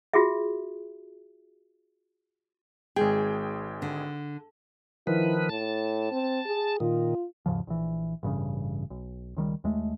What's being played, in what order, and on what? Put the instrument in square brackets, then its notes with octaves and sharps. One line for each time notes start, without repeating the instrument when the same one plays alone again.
[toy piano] F4 F#4 G#4 E5
[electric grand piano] G#1 G#3 G5 [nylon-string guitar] G#4
[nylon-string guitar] D3
[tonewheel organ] D#3 F3 B4 [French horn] E4
[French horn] A2 [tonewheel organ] A5
[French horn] C4
G#4
[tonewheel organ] A#2 D#3 [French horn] F4
[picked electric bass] D#2 G#2 C#3 F3
A#1 E3
A1 G2 C#3
B1
C#2 D#3 G3
D#2 G#3 A3